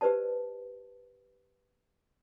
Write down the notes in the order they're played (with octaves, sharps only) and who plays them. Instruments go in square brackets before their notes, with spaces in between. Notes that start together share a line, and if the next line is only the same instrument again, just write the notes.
[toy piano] G4 B4 C5 D5 A5